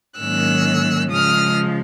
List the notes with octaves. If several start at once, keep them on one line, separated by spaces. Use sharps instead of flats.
G#2 D#3 F#3 A#3 C#4 E6 F#6
C#3 F3 G#3 D#6 F6